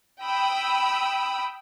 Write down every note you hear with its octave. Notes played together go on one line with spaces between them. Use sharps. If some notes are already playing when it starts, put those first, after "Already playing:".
G5 B5 D#6 E6